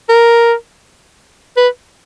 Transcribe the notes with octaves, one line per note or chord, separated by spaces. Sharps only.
A#4
B4